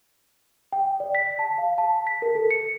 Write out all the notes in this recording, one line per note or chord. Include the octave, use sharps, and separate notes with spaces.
G5
D5
B6
A5
F5
A5
B6
A#4
A4
C#7